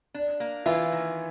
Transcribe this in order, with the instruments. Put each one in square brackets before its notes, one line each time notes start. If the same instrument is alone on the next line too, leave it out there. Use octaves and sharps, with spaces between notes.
[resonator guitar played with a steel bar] D4
A#3
[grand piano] E3 E4 [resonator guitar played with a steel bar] F4
[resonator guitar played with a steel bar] D#3